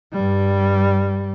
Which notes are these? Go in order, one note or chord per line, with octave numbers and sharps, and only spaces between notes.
G2 G3